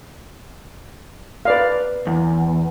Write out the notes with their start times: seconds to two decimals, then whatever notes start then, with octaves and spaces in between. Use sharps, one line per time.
1.45 B4 D5 F5
2.07 E2